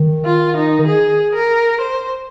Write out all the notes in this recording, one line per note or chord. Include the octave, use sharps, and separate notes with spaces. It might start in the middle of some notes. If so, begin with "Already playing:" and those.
Already playing: D#3
F4
D#4
G#4
A#4
C5